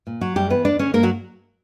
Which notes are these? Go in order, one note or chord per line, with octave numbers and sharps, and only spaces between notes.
A#2
F#3 F#4
F#2 G3 G4
E3 B3 B4
E2 D4 D5
D3 C#4 C#5
G2 A#3 A#4
F#3 F#4